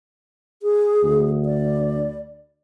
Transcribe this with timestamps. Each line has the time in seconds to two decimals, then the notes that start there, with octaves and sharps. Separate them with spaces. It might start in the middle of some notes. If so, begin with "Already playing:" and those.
0.62 G#4
1.04 D2
1.45 D5